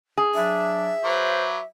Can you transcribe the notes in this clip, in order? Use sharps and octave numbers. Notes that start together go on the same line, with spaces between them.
G#4
F#3 D4 E5
F#3 B4 C5 D6